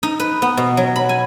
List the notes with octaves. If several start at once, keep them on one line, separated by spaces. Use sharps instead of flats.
D#4
B4
B3
B2
F#3
B5
G#5